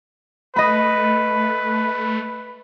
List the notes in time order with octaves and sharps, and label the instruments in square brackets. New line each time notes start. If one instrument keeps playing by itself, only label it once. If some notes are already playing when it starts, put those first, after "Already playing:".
[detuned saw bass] A3 [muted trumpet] B4 [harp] D#5 B5